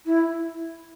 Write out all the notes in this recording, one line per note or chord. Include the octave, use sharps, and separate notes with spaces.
E4